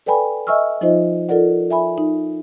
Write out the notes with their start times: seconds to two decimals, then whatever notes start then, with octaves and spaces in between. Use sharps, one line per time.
0.06 A4 B4 D5 G5 G#5 B5
0.47 D#5 E5 G#5 C#6 E6 F6
0.81 F3 D#4 F4 C5 D#5
1.29 F4 A4 A#4 D5 F#5
1.71 E5 G#5 B5
1.98 D#4